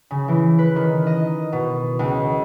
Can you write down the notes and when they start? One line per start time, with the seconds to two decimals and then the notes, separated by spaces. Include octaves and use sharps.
0.11 C#3
0.28 E3
0.59 B4
0.76 D#3
1.07 D#5
1.52 B2
1.99 C#2